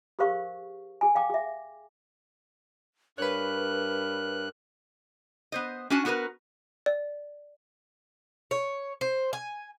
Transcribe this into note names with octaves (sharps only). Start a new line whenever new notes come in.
G4 G#4 A#4 C5 F5 C#6
G#4 G#5
F5 G5 D6
G#4 E5
G2 A#4 B4 C#5 F#6
B3 C5 D#5
C#4 D4 F#4 G#5 A5
B3 F#4 G#4 A#4 B4
D5
C#5
C5
G#5